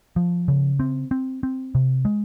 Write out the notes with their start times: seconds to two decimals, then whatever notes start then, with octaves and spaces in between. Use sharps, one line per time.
0.16 F3
0.48 C#3
0.80 C4
1.11 C4
1.43 C4
1.75 C3
2.05 G#3